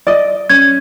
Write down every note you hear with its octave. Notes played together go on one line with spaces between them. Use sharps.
D5 D#5
C#4 G#6